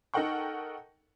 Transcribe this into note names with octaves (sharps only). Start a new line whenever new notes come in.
D#4 A4 A#4 F#5 G5 C#6